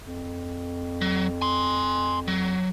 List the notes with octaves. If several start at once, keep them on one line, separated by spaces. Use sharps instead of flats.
F2
F#3
G#5 C6
F#3